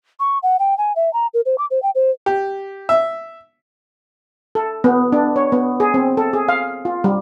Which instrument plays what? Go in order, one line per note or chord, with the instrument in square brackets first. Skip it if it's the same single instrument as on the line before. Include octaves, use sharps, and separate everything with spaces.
[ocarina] C#6
F#5
G5
G#5
E5
A#5
A#4
C5
D6
C5
G5
C5
[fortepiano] G4
E5
[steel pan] A4
B3
D4
C#5
B3
G#4
C4
A4
G#4
F5
F4
G3